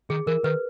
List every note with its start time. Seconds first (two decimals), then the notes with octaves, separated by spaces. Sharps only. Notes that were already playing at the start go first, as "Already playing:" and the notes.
0.10 D#3 G#4
0.27 E3 A#4
0.44 D#3 B4